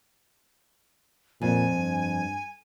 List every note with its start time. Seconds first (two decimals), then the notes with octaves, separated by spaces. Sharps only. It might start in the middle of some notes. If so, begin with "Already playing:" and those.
1.42 F2 A#2 G#5
1.75 G2